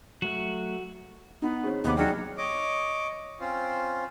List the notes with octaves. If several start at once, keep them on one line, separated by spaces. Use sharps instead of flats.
F#3 A3 F#4 F#6
B3 D#4
D#3 C4 C#4 G#4 C#5
D#2 C3 B3 C4 D6
F#3 D#4 G#4 D5 G5 F6 C#7
C#5 D#5 D6
C4 C#4 F4 C5